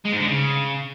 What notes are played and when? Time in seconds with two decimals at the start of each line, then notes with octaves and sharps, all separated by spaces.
0.05 G#3
0.12 G#2
0.20 D3
0.27 C#3